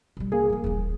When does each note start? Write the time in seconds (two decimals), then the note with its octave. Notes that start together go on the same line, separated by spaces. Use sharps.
0.17 B2 G3
0.32 C2 A#3 G#4
0.50 A2 F3
0.64 D#1 E3